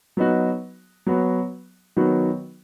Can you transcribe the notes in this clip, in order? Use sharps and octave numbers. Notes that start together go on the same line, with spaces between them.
F#3 B3 D#4 F#4
F#3 B3 F#4
D#3 F#3 B3 F#4